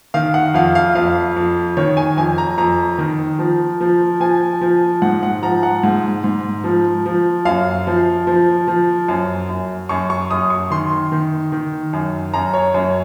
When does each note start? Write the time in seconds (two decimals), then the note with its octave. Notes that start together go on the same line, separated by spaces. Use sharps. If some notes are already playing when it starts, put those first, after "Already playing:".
0.14 D#3 F5
0.34 F#5
0.54 F2 F5
0.75 F5
0.95 F2 F5
1.36 F2
1.77 D#3 C#5
1.97 G#5
2.17 F2 G#5
2.38 A#5
2.58 F2 A#5
2.98 D#3
3.39 F3
3.81 F3
4.20 F3 G#5
4.61 F3
5.02 G#2 F#5
5.23 F#5
5.42 F3 A#5
5.63 F#5
5.83 G#2
6.24 G#2
6.64 F3
7.06 F3
7.45 F#2 F5
7.87 F3
8.27 F3
8.68 F3
9.08 F#2
9.49 F#2
9.89 F#2 C#6
10.10 C#6
10.31 F#2 D#6
10.50 C#6
10.70 D#3 C6
11.12 D#3
11.52 D#3
11.93 F#2
12.34 F#2 A#5
12.54 C#5
12.74 F#2 C#5